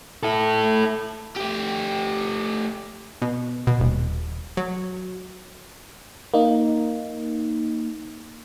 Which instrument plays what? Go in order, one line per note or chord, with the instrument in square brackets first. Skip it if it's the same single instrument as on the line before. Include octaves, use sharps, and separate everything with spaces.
[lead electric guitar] E4 A4
[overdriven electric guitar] A3 G4
[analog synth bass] B2
B2
D#1
F#3
[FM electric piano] A#3 D#4